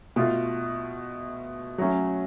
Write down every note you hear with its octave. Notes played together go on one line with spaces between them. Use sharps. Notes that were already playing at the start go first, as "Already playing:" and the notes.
B2 A3 F4
F#3 A3 C#4